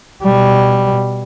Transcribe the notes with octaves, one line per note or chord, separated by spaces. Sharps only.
B2 G3